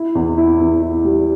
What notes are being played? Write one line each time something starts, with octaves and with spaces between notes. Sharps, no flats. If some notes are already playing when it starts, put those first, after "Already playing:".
Already playing: E4
E2
E4
E2
E4
G3